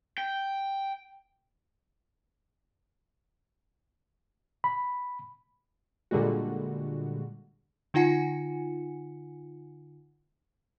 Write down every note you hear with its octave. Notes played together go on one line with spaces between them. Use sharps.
G5
B5
A#2 D3 G3 G#3 F#4
D3 D#4 F4 F#5 G#5 C#7